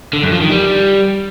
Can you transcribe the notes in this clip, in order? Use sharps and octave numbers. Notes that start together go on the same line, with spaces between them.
D3
F#2
F3
D#3
G3